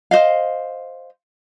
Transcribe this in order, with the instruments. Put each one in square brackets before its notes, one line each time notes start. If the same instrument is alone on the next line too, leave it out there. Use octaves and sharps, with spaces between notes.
[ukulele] C5 D#5 F5